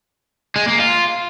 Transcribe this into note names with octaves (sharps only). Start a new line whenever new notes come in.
G#3
A#3
F4